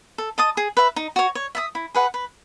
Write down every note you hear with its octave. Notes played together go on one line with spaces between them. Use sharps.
A4
D#5 A5 D#6
G#4
B4 E5
D#4
F#4 C#5
C#5
E5 A5 D#6
E4
G#4 B4 F#5
B4